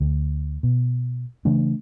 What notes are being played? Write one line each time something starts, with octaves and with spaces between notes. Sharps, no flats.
D2
B2
C#3 E3 A3 D4